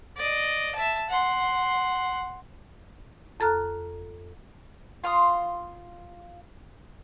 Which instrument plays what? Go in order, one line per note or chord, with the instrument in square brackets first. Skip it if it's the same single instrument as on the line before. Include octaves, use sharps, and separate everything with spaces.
[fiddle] D5 D#5
E5 A5
F#5 C6
[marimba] F2 A4 A#5 F6 F#6
[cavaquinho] F4 F5 C6 D#6